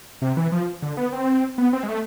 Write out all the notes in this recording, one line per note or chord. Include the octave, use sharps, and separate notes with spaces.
C3
E3
F3
D3
B3
C4
B3
C4
G#3
A3